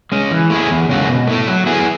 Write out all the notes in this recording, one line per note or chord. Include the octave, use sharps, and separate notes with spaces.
G#3 C#4
E3
A3 E4 G#4
E2
C#3 G#3 C#4 F#4
B2
A3 E4 A4
F#3
B3 E4 G#4